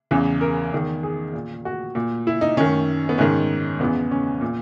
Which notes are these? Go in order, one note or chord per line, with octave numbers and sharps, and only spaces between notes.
E2 C#3 E3
A#4
E2 D#3
G#4
A#2
F#4
A#2
E4
D#4
F#2 D#3 C#4
B3
G#2 D#3 C#4
E2 C#3 E3 B3
C#4
A#2